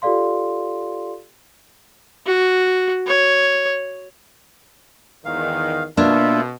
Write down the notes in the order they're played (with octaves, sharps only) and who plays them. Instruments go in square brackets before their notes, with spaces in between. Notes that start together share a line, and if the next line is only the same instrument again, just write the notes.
[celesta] F4 G4 A4 D5 F5 C6
[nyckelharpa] F#4
C#5
[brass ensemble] E2 G#2 D#3 [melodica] F5
[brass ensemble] B2 [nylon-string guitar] A#3 D4 [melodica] F4 E5